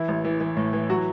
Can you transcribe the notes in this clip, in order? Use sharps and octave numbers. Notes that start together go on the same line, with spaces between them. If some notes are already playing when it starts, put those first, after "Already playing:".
Already playing: E3 E4
A1
E3
E3
A2
E3
F#3 F#4